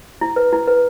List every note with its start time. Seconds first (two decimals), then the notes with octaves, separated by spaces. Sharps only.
0.21 E4
0.36 B4
0.53 E4
0.67 B4